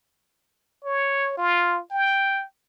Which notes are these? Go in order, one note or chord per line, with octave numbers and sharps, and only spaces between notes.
C#5
F4
G5